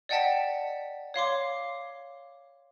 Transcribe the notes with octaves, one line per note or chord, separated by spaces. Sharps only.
D5 D#5 F#5 G5 A5 B6
C#5 F5 C6 D6